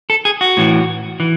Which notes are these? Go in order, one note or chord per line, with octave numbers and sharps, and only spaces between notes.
A4
G#4
F#4
A2 E3
E3